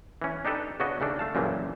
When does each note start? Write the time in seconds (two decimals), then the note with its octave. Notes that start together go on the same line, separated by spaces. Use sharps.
0.22 E3 C#4
0.45 D4 D#4 G4 A4 B4
0.80 C#3 B3 C#4 D4 F#4 D#5
1.00 D#2 C#3 A3 D4
1.19 A3 F5 A5
1.35 F#2 A#2 C#3 E3 F3 G3